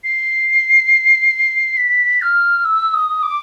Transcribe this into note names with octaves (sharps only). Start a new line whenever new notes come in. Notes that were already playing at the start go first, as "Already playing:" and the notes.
C7
B6
F6
E6
D#6
D6